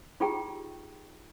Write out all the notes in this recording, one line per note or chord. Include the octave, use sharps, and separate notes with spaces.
D#4 F4 G4 G#4 G5 A#5